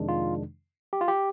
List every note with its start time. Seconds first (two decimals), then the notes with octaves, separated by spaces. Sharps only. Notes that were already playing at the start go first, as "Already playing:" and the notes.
Already playing: F2 C3 D#3 G#3 D4
0.08 F4
0.93 G4
1.01 F4
1.08 G4